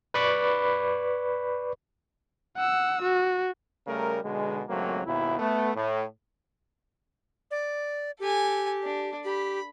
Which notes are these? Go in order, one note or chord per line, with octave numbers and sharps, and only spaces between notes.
B4 D5 B5 C#6 D6
F#5 E6
F#4
C#3 G3 A3 A#4
B1 B2 D3 G#3
G#1 C#2 F#3 A3 A#3 C4
G#1 D#2 B2 E4
A3 B3
A2
D5
G4 A4 G#5
D4
G4 B5